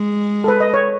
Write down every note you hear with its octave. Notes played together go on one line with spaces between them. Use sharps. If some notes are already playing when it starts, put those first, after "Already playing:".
Already playing: G#3
A4
B4
D#5
C#5